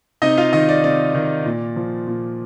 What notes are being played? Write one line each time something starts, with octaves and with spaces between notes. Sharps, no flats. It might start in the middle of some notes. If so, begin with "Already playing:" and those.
C3 D#4 D#5
F4 F5
D#3 D#4 D#5
D5
C3 D5
D#3
A#2
F3
A#2